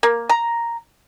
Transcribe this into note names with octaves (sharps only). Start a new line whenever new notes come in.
A#3
A#5